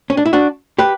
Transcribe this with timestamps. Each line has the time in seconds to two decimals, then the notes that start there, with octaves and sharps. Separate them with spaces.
0.10 C#4
0.17 D4
0.26 E4
0.33 D4 F#4
0.79 G4 B4